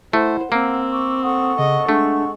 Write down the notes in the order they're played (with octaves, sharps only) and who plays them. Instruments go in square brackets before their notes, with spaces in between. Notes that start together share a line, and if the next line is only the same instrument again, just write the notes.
[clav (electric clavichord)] A3 [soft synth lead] E4 [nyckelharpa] C5 [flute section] F#5
[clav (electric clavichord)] A#3 [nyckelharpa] C4 [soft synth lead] E6
[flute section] C#6 D6
[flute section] A4 F#5 C#6 [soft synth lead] D#6
[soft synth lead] C#3 [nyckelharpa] D#5
[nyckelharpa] G#3 [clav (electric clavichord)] A3 [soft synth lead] D4